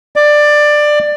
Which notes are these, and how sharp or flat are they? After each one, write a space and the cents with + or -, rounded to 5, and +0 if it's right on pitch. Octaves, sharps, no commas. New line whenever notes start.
D5 +15